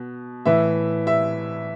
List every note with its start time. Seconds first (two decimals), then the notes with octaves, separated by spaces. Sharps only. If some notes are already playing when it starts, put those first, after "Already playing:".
Already playing: B2
0.46 A2 E3 E5
1.07 E5